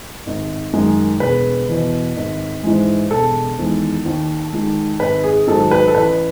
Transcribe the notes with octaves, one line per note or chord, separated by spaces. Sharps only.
G#1
F#2 D#3 G#3
E1 B4
E2 B2
G#1
G#2 E3 G#3
E1 A4
E2 D#3 G#3
D#2
D#3 G#3
G#1 B4
G#4
G#2 D#3 F#3 A4
B4
A4
A1 B4